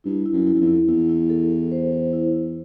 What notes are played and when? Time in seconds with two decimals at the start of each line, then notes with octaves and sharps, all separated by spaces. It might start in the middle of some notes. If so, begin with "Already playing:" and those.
0.04 G2 E4
0.26 E4
0.33 F#2
0.47 E4
0.54 F#2
0.61 F2
0.67 E4
0.88 E2 E4
1.09 E4
1.30 A4
1.50 A4
1.71 C5
1.92 C5
2.13 E4